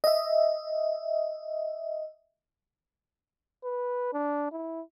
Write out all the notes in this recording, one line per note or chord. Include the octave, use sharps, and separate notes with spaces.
D#5 E5
B4
D4
E4